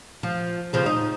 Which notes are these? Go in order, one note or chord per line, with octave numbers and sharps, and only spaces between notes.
F3
C#3 F3 C4
D#4